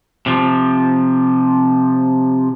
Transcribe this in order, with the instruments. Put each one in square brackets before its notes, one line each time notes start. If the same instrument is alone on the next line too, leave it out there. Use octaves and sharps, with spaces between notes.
[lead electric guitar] C3 F3